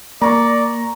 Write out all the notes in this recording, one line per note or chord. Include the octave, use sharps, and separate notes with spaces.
A#3 D5 A#5 C#6